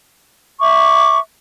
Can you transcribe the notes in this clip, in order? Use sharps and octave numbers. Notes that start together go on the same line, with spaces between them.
E5 C#6 D6